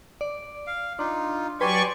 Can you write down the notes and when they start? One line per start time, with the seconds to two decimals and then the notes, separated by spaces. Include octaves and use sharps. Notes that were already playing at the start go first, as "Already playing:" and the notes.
0.21 D5
0.67 F5
0.99 D4 D#4 F4
1.61 F#3 G4 B4 D5 G#5 C6 C#6